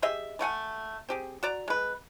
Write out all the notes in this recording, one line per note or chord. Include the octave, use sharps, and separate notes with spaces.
G4 G#4 D#5 E5
E3 A3 F#5 G#5
C4 G4 G#4
F#4 D5 A#5
G#3 B4